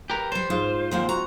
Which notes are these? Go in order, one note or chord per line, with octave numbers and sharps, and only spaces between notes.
G4 A#4 B4
G3 C5 D5
G#2 F4
D#2 A#3 C4 F4 F#5
F#4 A#5